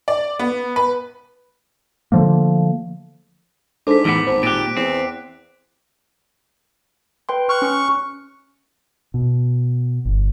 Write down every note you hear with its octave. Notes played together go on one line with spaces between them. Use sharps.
D5
B3
B4
D3 F3 A3 A#3
G#2 D4 A4 C5 D6 B6
E2 A2 E3 B3 D6 B6
G#1 C5
A#2 G4 F#6 D7
E2 C4
B4 G5 C6
C#6 F6 F#6
C#4 F6 C#7
B2
G1